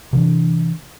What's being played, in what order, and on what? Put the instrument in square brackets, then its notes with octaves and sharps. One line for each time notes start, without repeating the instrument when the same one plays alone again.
[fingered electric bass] C3 E3 D4